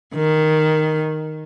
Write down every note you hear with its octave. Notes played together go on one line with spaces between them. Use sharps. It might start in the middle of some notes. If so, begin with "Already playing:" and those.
D#3